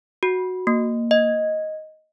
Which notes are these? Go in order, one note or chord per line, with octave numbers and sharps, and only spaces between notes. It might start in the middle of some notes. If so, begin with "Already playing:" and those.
F#4
A#3
D#5